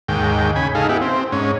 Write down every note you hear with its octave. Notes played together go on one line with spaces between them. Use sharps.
D#2 G#2 G5
C#3 G#5 B5
D#4 G#4 A4 F5
B3 E4 G4
C4
G#2 C#4